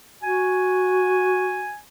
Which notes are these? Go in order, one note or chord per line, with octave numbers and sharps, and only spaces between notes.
F#4 G#5